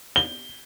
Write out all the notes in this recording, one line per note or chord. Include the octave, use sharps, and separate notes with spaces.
G7